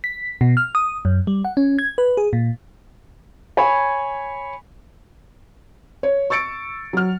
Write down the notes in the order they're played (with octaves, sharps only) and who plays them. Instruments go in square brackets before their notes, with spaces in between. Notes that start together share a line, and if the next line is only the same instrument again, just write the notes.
[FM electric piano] B6
B2
F6
D#6
F#2
G3
F#5
C#4
G#6
B4
G#4
A#2
[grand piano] C#5 G#5 B5
[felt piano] C#5
C#6 E6 A6 C#7 D7
F#3 F6